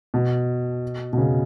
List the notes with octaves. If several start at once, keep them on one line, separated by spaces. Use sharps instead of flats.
B2
B2
C#3